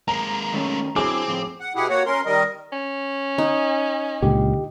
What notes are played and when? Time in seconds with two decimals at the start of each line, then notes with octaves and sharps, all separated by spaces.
0.08 G#3 A#3 A#5
0.54 D#3 A3 C#4
0.96 D3 F#3 C4 E4 G#4 D6
1.27 A2 F3
1.60 F#5
1.76 B2 E4 G4 G#4 F#5
1.89 A#3 F#4 C#5 F#5
2.06 C#4 A#4 C6
2.26 D#3 G3 A#4 D#5
2.72 C#4
3.38 D#4
4.22 C#2 A#2 D3 G4